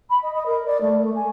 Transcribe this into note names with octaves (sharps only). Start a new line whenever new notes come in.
B5
D#5
D#5
A#4
D5
A3
A3
G#5